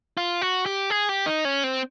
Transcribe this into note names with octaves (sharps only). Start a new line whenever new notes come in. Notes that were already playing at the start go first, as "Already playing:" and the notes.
F4
F#4
G4
G#4
G4
D#4
C#4
C4